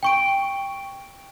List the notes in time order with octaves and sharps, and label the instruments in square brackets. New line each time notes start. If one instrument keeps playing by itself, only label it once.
[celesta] G5 C#6 D7